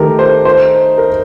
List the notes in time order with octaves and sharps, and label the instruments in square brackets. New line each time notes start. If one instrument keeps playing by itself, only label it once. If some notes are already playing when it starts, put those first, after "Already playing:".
Already playing: [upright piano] D#3 A3 D#4 [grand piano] G4 A4 A#4
[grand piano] C5
C5
A#4